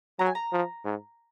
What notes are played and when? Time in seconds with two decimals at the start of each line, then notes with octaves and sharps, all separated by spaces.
0.19 F#3 A#5
0.26 G#5
0.35 A#5
0.52 F3
0.85 G#2